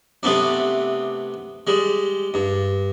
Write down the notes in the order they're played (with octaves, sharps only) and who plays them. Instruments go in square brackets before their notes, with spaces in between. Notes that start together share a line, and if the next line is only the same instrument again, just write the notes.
[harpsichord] C3 A3 B3 C4 D4
G3 G#3
G2